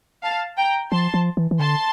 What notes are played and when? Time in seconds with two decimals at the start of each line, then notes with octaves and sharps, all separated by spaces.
0.23 F5 A5
0.57 G5 A#5
0.91 F3 A5 C6
1.14 F3
1.37 E3
1.51 E3
1.59 D3 A5 C6